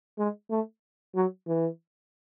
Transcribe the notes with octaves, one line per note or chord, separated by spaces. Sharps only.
G#3
A3
F#3
E3